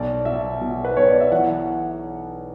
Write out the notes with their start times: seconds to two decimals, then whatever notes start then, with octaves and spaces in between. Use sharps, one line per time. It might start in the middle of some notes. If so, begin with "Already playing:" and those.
Already playing: B1 D5
0.25 B2 E5
0.61 B2
0.85 B4
0.97 B1 C#5
1.09 D5
1.20 E5
1.31 E3 F#5